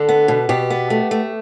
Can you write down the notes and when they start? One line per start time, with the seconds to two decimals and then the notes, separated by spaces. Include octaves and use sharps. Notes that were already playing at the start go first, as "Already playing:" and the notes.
Already playing: D3 A4
0.09 B3
0.28 B2
0.49 B2 G4
0.70 B3
0.90 A3
1.11 A3